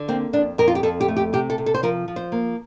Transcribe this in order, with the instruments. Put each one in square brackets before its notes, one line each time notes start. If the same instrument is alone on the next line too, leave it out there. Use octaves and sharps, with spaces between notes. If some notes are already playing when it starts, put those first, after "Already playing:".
Already playing: [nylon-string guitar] D3
A#3 C4
F2 D4
F2 A#4
F4
G4
F2 A4
G4
A3
G4
C3 G4
A4
C3
A4
C5
F3 A#4
F3
C5
A#3